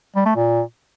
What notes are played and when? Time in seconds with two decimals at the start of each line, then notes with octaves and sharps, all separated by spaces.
0.16 G3
0.26 A3
0.36 A#2